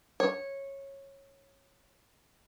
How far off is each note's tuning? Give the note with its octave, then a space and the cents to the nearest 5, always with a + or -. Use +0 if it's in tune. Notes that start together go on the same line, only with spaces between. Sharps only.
C#5 -15